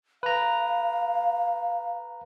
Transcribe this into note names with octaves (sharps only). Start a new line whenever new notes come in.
B4 F5 A#5